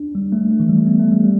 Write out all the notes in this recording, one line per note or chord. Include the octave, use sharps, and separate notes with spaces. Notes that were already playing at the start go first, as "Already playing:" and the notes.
Already playing: D4
G3
A3
A3
E3
G3
A3
B3
A3
G3
G3